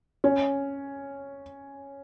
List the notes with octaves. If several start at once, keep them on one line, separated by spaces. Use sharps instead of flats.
C#4